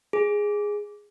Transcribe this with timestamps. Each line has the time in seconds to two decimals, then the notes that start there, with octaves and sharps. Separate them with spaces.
0.13 G#4